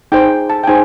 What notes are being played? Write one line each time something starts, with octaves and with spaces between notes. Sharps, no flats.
D#4 G#4 C5 G5
A5
G5
D#4 G#4 C5 G#5